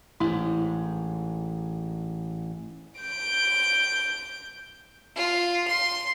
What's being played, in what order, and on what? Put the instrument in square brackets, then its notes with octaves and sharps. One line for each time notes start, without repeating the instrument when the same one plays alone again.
[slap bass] A1 G#2 [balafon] E4
[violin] G6 D7
[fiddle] F4
C6